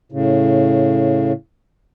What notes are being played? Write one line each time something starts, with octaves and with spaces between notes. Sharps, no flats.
A2 C#3